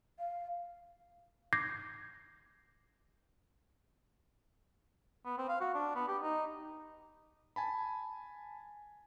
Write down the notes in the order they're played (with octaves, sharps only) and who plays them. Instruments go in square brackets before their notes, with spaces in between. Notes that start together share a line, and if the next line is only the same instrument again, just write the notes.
[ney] F5
[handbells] D6 G6 G#6 A#6 C7
[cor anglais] B3
C4
F5
F#4
D4
B3
G4
D#4
[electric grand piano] G#5 A5 B5